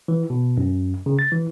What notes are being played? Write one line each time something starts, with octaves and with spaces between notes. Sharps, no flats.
E3
B2
F#2
C#3
A6
E3